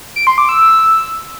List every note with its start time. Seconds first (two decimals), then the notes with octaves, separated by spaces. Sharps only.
0.16 D7
0.27 C6
0.38 D6
0.49 E6